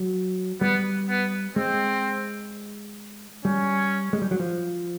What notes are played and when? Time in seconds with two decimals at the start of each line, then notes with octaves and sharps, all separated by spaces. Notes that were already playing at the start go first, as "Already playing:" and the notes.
Already playing: F#3
0.61 G3 B3
1.09 B3
1.56 G#3 C4
3.45 G3 C#4
4.13 G#3
4.22 G3
4.31 F#3
4.39 F3